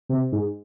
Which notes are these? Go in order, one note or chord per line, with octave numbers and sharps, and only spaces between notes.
C3
G#2